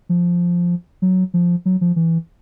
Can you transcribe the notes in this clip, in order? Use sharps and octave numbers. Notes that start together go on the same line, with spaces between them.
F3
F#3
F3
F#3
F3
E3